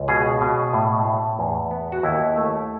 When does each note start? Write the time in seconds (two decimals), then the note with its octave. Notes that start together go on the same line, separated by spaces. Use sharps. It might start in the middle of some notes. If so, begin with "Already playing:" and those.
Already playing: C#2
0.08 B2 G#4
0.41 B2
0.73 A2
1.05 A2
1.39 E2
1.71 B3
1.92 F#4
2.03 D#2 E4
2.36 A3